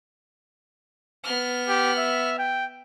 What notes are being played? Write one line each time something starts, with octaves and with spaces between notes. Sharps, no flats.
B3 F6
G4
E5
G5